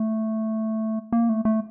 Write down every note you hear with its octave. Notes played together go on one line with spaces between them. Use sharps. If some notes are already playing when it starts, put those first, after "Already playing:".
Already playing: A3
A#3
A3
A3